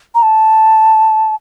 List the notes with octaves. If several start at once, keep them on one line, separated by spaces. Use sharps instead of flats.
A#5
A5